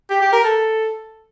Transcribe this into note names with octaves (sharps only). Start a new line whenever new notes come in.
G4
G4
A#4
A4